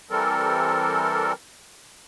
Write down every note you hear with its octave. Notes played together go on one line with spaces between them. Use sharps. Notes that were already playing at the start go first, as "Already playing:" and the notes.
E3 G3 C4 A4 A#4